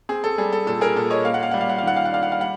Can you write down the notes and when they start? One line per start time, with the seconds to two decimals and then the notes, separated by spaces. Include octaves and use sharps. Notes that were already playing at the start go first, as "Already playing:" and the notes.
0.09 C4 G#4
0.24 A4
0.38 G3 G#4
0.53 A4
0.67 A#2 A4
0.81 G#4 A#4
0.96 A#2 A4
1.10 C#5 D#5
1.25 A#3 F5
1.34 F#5
1.43 F5
1.51 G3 F#5
1.61 F5
1.70 F#5
1.78 F5
1.83 D#3 F#5
1.96 F5
2.05 F#5
2.12 D4 F5
2.23 F#5
2.32 F5
2.41 G3 F#5